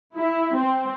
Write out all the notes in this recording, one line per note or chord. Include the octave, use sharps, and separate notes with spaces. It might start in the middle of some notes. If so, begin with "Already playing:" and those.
E4
C4